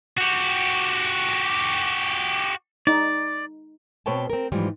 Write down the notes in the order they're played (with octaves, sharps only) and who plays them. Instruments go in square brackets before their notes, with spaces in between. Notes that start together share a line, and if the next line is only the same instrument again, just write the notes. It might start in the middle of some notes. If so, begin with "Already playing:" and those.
[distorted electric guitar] F#4 G4
[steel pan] D#4 [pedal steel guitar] D5
[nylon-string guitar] B2 C4 B4 C#5 G5 A5
C4 A#4
G#2 E3 F3 G3